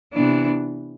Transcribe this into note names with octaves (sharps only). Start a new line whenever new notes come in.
C3 E3 B3 D4